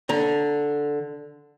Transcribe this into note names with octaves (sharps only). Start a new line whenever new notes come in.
D3 A#5